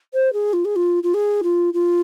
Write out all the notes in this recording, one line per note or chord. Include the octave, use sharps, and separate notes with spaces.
C5
G#4
F4
G#4
F4
F4
G#4
F4
F4